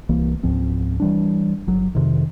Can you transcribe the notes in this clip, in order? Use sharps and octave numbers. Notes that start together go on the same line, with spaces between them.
C2 E3 A#3
C#2 G#2 F3 C4
E3 G3 D4
G1 F#3
F2 C3 D#3